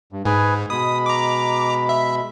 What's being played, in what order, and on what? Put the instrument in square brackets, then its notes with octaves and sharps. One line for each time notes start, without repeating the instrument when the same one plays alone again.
[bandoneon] G2
[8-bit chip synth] G#2 [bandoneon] G#4 B4 G#5
[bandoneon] B2 G#3 B5 [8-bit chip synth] D#6
[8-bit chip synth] A#5 D6
E5